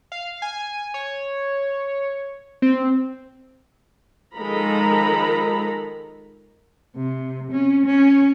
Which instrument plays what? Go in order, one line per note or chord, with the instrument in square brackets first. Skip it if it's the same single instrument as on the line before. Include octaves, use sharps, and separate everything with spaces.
[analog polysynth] F5
G#5
C#5
C4
[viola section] D#3 F3 G#3 A4 A#5 B5
[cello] C3
C#4
C#4